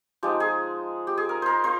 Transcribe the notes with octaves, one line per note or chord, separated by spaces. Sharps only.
F3 G#3 D#4 G4
G#4
G4
G#4
A#4
A#4 C5
F4 C5